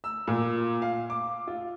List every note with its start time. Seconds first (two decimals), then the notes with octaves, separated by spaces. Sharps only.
0.04 E6
0.27 A#2
0.82 F5
1.10 D6
1.47 F4